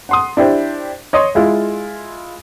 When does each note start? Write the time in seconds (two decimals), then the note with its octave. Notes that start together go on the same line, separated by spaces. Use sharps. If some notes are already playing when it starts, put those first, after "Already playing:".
0.09 F#5 C6 D#6
0.37 D4 E4 G4 C5
1.13 C#5 D#5 C6 D#6
1.35 G#3 E4 F4